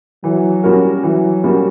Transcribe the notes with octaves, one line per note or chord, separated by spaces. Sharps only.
E3 F#3
G3 C#4 F#4 A#4
E3 F#3
G3 C#4 F#4 A#4